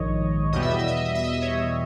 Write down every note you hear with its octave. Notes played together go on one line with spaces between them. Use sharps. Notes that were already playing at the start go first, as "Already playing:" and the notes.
Already playing: A#1 G#2 D#3 C#5 D#5
E2 B2 G3 B3 D#5
E5
D#5
E5
D#5
E5
D#5
E5
D#5
E5
C#5 D#5